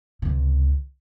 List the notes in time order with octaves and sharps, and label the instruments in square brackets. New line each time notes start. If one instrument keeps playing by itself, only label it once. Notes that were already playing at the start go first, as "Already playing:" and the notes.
[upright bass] C#2 C3